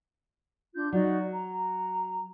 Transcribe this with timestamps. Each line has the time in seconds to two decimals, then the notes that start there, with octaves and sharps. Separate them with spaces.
0.74 D4 F4 G6
0.92 F#3 D#4 F#4 D5
1.32 A#5